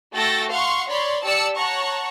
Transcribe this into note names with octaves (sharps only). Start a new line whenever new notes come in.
A3 F#4 A4 G5 A6 A#6
F5 F#5 C6 C#6
C#5 D5 B5 C6
G4 D5 A5 E6 C#7
C#5 F#5 A5 A#5 C#6